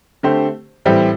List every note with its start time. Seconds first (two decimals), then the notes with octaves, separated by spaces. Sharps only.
0.23 D3 A3 C4 G4 C5
0.85 A2 E3 G3 C4 G4